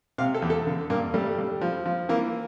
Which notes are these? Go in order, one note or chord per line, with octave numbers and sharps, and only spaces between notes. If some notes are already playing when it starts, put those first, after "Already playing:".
C3 F5
A4
E2
A4
D3
G2 A#3
G3 A3
G3
F3
F3
E3 A#3